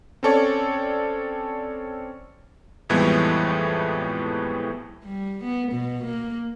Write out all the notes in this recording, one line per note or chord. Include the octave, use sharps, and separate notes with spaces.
C4 C#4 A4 C#5 D5
F2 A2 E3 G3 G#3 B3
G3
B3
B2
A#3